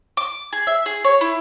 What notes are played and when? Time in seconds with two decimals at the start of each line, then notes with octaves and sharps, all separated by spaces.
0.17 D6
0.53 G#4
0.67 E5
0.86 G#4
1.04 C#5
1.21 E4